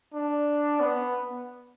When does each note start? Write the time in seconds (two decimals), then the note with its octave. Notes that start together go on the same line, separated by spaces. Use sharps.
0.13 D4
0.80 B3